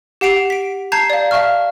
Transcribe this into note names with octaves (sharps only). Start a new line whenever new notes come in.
G4 F#5 C7 D7 F7
B6 D7
A5 A#5 G6 G#6 C7
D5 F5
E5 F5 A5 C#6 F6